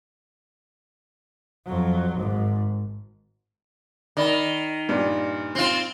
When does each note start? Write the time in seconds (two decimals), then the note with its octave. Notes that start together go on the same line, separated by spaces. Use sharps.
1.66 F2 F#3
2.16 G#1 G#2
4.17 D#3 D5 B5
4.89 G2 A#2 D5
5.55 C4 F4